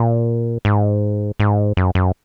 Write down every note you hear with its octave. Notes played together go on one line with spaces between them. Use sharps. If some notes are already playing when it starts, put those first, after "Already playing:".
Already playing: A#2
G#2
G#2
F#2
F#2